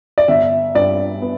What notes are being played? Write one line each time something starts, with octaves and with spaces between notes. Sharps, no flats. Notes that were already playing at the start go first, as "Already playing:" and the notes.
D5
G1 E5
G2 D5
B3